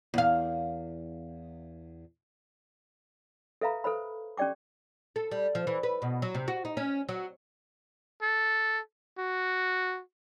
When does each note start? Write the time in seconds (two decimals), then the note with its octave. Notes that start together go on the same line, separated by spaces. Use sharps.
0.14 E2 F5
3.61 A4 B4 E5 F5 A#5 B5
3.84 A4 B4 C5 B5
4.37 C#4 G4 D5 G5 D6
5.16 A4
5.31 G3
5.55 F3
5.67 E3
5.83 B4
6.02 B2
6.22 F#3
6.35 C3
6.48 F#4
6.65 D#4
6.77 C#4
7.09 F#3
8.22 A4
9.18 F#4